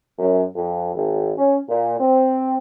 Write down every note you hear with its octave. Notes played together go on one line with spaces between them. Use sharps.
F#2
F2
G#1
C#4
A#2
C4